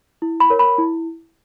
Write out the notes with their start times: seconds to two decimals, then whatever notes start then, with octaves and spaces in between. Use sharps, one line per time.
0.22 E4
0.40 B5
0.50 A#4 C#5
0.59 B5
0.78 E4